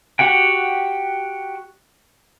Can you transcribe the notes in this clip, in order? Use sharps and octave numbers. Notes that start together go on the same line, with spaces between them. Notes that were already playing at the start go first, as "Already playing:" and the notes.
F#4 G4 F#5 G5